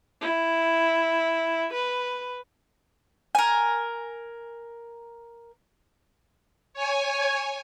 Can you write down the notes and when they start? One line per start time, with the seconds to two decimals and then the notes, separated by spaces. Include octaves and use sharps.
0.21 E4
1.73 B4
3.35 A#4 G#5
6.74 C#5 G#5